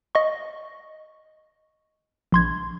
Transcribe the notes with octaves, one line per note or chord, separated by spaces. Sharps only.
D#5 C#6
A#1 C6 G#6